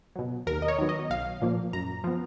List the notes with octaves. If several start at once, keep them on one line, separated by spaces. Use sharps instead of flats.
B2 F#3
D#2 A#4
D#5
C#5
D#3 F#3 B3
D#5
B1 F5
A#2 F3 A#3
F#2 A#5
F3 B3